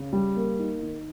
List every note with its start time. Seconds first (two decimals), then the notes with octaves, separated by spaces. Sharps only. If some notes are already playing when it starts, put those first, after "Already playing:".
Already playing: C#3
0.13 G3
0.36 A#3
0.59 D#4
0.83 D#3